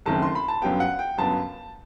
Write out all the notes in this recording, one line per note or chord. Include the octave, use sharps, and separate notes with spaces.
F#1 F#2 D#3 A3 C4 A5
C6
B5
A5
G1 F#2 F#3 B3 G5
F#5
G5
G1 F#2 F#3 B3 A5